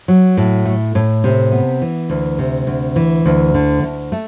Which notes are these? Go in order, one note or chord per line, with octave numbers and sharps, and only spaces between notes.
F#3
A2
A3
A2
C3
B3
E3
D2
C3
D2
E3
D2
D3
D2
A3